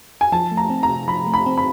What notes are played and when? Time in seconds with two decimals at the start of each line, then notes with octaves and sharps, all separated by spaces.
0.21 G#5
0.32 F3 A5
0.51 A3
0.57 A#5
0.70 C4
0.83 A#5
0.89 C3
1.08 F3 B5
1.26 A3
1.34 B5
1.46 C4
1.58 B5